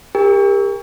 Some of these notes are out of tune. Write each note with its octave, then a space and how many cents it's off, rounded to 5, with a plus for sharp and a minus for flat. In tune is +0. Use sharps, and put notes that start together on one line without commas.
G4 +35 A#4 +0 G5 +40